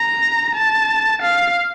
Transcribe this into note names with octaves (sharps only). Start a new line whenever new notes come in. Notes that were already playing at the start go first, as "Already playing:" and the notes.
Already playing: A#5
A5
F5